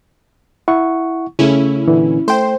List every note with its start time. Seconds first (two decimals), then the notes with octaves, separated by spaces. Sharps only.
0.68 E4 F#5 C#6
1.39 C#3 A3 C#4 E4
1.87 A#2 D3 E3
2.28 A3 C5 G5 C6